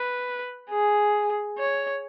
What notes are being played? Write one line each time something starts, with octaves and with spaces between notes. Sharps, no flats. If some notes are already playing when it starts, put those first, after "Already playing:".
Already playing: B4
G#4
C#5